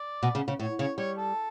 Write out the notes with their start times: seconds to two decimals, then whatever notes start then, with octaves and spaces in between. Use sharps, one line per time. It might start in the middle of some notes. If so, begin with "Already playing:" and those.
Already playing: D5
0.23 B2
0.35 C#3
0.48 C#3
0.59 A2 C#5
0.79 C#3 C#5
0.98 G3 C#5
1.17 A4